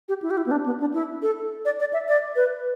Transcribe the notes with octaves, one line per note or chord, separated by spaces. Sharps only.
G4
E4
G4
E4
B3
D4
B3
D4
E4
A4
D5
D5
E5
D5
B4